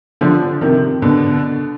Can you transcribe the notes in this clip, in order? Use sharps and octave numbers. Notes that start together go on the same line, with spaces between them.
D3 F3
C3 D#3
B2 D3